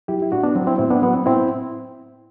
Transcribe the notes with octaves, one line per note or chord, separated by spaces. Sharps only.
F#3 E4 G4
E4
A2 D4 F#4
B3 D4
F#3 C4
C4 E4
A2 C4 E4
B3 D4
F#3 B3
C4
A2 C4 E4